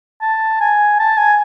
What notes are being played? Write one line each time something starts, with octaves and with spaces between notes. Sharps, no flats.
A5
G#5
A5
G#5